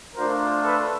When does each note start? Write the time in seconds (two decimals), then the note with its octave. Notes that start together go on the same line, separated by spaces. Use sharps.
0.15 A3 D4 F4 A#4 C5
0.63 A4 B4